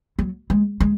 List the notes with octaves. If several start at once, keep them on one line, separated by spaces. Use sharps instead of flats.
F#3
G#3
G#3